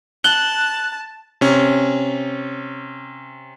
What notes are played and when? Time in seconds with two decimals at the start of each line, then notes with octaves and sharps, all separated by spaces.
0.24 A5 F#6 G7
1.41 C3 C#4